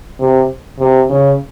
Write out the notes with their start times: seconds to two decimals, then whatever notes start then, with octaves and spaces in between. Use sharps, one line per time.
0.20 C3
0.79 C3
1.09 C#3